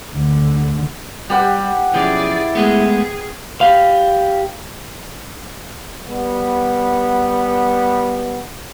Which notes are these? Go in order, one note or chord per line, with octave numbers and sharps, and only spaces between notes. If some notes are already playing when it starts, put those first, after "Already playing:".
D2 D3
G3 G4 B4 F#5
B1 F3 C#4 E4 G#4 D5
G#3 A3 B3 G#4
G4 F5
G3 B3